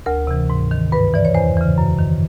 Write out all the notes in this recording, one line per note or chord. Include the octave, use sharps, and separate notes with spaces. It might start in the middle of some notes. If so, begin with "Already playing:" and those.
D2 A#4
C3 E3
G#2
D#3
G2 B4
E3 D5
C#5
E2 C5
C#3 E3
F#2
D#3